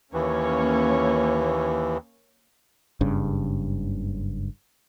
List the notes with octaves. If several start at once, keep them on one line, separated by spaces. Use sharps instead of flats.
D#2 E3 A#3 C#4 C#5
F#1 G2 C#3